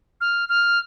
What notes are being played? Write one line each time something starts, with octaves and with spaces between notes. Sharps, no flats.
F6
F6